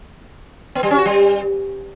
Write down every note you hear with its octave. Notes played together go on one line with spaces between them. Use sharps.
B3
G3
C#4
F#4
G3